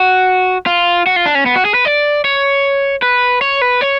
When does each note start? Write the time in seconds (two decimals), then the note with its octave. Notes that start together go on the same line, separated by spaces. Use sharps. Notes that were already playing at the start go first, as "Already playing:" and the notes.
Already playing: F#4
0.66 F4
1.06 F#4
1.16 F4
1.26 D4
1.35 C#4
1.46 B3
1.56 F#4
1.65 G#4
1.74 B4
1.85 D5
2.24 C#5
3.02 B4
3.41 C#5
3.61 B4
3.81 C#5